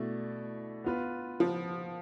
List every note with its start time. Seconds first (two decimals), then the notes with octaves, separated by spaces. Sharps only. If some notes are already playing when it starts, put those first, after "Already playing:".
Already playing: B2 A3 E4 A4 D5
0.84 B3 F4 B4
1.40 F3